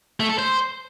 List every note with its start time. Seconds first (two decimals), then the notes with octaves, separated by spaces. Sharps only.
0.20 A3
0.29 A4
0.38 C5